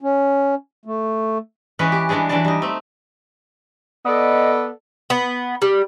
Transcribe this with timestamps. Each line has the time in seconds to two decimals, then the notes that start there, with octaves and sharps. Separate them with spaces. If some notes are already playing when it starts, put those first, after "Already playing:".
0.01 C#4
0.85 A3
1.79 E3 G#3 C#4 B4
1.92 G4
2.09 E3 G3 G#3 D4 G#4
2.29 E3 F#3 D4 D5 A5
2.45 G3 D#4
2.62 A3 C4
4.05 B3 A4 D5 D#5
5.10 B3
5.62 G3